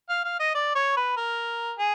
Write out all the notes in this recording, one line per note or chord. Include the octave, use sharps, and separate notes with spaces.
F5
F5
D#5
D5
C#5
B4
A#4
G#4